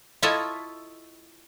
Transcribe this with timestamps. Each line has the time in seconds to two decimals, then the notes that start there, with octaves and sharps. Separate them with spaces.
0.23 E4 F4 A4 C#5 D#5 E5